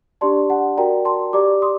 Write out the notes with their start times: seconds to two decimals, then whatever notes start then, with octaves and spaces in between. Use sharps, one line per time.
0.21 D4 G4 D5 A5 C6
0.50 F#5 A5
0.77 F#4 A#4 D5 G5 A#5
1.05 A5 C6
1.33 G4 D5 A#5 D6
1.62 C6 D#6